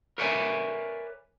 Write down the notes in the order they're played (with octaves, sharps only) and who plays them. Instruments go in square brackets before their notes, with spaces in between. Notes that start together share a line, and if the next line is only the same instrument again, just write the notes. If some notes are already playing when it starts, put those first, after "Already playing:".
[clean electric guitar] A#4 B4 C#5 D5 E5 G#5